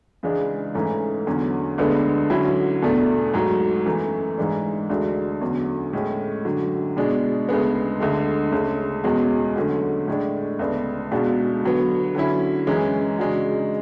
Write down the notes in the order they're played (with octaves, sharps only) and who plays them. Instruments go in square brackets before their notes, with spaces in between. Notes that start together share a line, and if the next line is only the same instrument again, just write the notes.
[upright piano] C#2 C#3 E3 G#3 D4
G#2 E3 A3 C#4
E2 D3 F#3 C#4 F#4
D2 D3 G#3 B3 D4
D3 F#3 C#4 E4
E2 B2 A3 D4
G#2 F#3 A3
F#2 E3 A3
G#2 E3 G#3 D4
D2 D3 G#3 D4 F#4
E2 D3 F#3 C#4
A2 G#3 C#4
F#2 D3 F#3
B2 G#3 D4
D2 C#3 G#3 B3
D2 D3 G#3
D2 C#3 G#3 C#4
E2 B2 G#3 C#4 F#4
D3 F#3 A3 C#4 F#4
A2 G#3 D4
D2 C#3 G#3 B3 D4
C#2 B2 G#3 D4 F#4
D3 F#3 B3
D3 F#3 C#4 E4
F#2 E3 G#3 C#4
C#3 G#3 D4 F#4